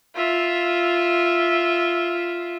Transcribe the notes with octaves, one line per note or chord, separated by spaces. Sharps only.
F4 E5